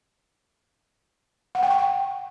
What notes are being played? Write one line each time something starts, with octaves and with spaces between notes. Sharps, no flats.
F#5
G5
C#6
G5